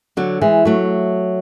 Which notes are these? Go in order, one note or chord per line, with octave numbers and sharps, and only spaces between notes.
D3 F#3
E3 G#3
F#3 A3